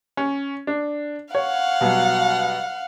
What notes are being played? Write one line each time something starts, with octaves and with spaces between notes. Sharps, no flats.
C#4
D4
C#5 F5 F#5
B2 F#3 G3